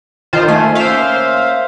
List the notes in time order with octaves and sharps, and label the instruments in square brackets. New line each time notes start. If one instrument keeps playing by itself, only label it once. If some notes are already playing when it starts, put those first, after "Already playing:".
[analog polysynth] D#3 F4 C5
[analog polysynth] A3 [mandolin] G#5
[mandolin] A#3 C#4 E5 [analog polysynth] C5 F5